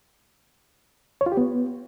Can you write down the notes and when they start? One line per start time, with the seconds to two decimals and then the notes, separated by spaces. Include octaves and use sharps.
1.21 C#5
1.26 F4
1.32 G4
1.37 B3